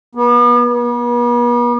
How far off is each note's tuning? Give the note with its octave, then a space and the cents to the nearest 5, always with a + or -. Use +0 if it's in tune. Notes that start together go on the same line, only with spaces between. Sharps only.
B3 -35
B3 -45